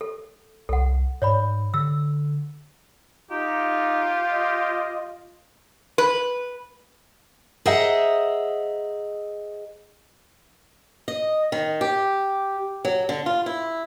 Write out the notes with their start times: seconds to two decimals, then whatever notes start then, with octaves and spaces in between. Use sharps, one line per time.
0.01 A4
0.69 C2 A4 F#5
1.22 G#2 C#5 D5 B5
1.74 D3 E6
3.31 D#4 F4 G4
4.31 D#5
5.98 B4
7.66 G#4 C5 D#5 E5 F#5 A#5
11.08 D#5
11.52 D#3
11.81 G4
12.85 F#3
13.09 D3
13.26 F4
13.46 E4